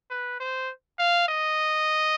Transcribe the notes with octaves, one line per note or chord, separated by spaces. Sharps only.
B4
C5
F5
D#5